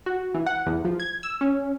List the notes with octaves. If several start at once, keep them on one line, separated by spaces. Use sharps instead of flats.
F#4
E3
F#5
E2
F3
G#6
E6
C#4